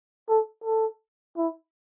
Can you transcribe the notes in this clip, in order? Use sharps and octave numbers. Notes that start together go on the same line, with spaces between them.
A4
A4
E4